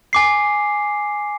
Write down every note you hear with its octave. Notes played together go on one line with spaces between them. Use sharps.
G#5 D6 C7